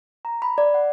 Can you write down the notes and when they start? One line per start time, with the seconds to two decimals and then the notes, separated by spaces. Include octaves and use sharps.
0.25 A#5
0.42 B5
0.58 D5
0.74 F#5